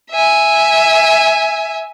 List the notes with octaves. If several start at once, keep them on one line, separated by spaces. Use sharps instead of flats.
E5 G#5